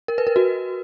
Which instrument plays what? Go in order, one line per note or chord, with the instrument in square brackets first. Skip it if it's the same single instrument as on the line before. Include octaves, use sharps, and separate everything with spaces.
[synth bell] A#4
B4
A#4
F#4